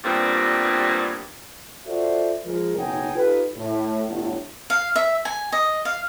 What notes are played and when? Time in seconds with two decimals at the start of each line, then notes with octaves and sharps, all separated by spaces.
0.04 G2 A#2 G3 B3 C4
1.86 F4 F#4 A4 C5 D5 E5
2.46 F3 G#3 A#4
2.76 F#1 B1 F#3 D#4 G5 G#5
3.14 D#4 F4 G4 A4 B4
3.56 A2
4.08 G1 A2 F#3
4.70 F5
4.96 E5
5.25 G#5
5.52 D#5
5.85 F5